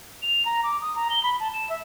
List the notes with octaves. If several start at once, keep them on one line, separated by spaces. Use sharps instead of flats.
F7
A#5
D6
D#6
A#5
G7
B5
A5
E7
E5